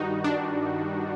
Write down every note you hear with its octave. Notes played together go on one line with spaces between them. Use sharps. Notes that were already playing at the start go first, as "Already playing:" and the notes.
Already playing: G2 D#3 G3 D#4 F#4
D4